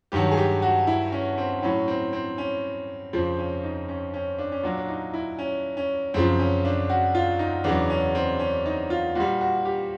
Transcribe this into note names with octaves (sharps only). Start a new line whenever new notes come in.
G2 D#3 F#3 G4
G#4
G4
F#4
E4
C#4
C4
A2 F#3 C#4
C4
C4
C#4
F2 C#3 F3 C4
C#4
D#4
C#4
C#4
D4
C#4
A#2 F#3 D4
D4
D#4
E4
C#4
C#4
F#2 C#3 F3 C4
C#4
D4
F#4
F4
D#4
E2 C#3 F#3 D4
C#4
C4
C#4
D#4
F4
A#2 G3 F#4
F#4
G4